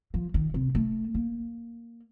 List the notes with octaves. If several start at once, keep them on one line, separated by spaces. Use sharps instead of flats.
F3
D#3
C3
A3
A#3